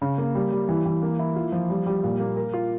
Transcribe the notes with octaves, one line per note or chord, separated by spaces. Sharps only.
C#3
A#3
G3
G3
E3
E3
A#3
E4
F4
F3
G3
G3
A#2
A#3
A#4
F4